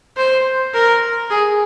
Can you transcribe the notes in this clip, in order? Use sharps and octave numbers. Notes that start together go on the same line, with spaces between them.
C5
A#4
G#4